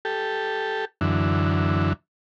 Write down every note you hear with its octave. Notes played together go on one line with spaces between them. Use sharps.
G4 A4
F#2 D3 E3